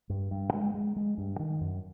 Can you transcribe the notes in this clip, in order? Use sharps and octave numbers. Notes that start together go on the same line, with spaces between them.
G2
G2
G#3
G#3
G#3
G2
D#3
F#2